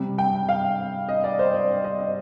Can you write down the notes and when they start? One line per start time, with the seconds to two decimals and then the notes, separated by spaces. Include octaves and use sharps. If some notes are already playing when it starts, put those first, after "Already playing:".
Already playing: C3 G3
0.18 G5
0.49 F5
1.09 D#5
1.24 D5
1.39 C5
1.54 D5
1.84 D#5
1.99 D#5